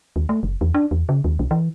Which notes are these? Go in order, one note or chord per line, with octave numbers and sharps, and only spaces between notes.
D#2
A3
F#1
E2
D4
E2
C#3
D#2
B1
E3